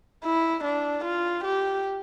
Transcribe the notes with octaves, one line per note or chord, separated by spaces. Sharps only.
E4
D4
F4
G4